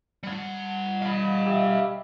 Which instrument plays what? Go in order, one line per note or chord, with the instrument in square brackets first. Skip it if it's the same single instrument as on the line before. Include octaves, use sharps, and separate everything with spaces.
[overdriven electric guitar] G3 F#5
[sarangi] D#5 [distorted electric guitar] F5 B5
[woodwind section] G4 E5